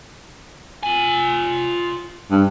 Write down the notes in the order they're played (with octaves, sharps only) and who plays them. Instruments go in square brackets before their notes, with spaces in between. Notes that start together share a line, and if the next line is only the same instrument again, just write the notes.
[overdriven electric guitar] F4 G#5
[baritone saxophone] G2